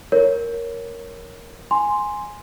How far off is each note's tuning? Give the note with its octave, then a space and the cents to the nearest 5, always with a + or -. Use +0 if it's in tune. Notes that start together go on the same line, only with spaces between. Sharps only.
A#4 +0 C#5 +0
G#5 +0 C6 +0